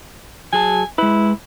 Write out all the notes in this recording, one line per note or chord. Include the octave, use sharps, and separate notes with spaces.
F#3 G#4 G#5 A5
G#3 E4 B4